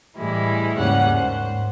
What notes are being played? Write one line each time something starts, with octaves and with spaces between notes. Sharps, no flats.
A2 E3 G3 G#3 E4
D#2 G#2 C#3 G3 C#4 F#5
G#2 C5